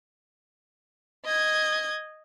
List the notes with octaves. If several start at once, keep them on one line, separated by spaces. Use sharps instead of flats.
D#5 G#6